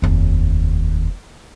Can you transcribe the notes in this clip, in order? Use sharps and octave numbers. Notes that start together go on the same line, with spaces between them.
F1 D#2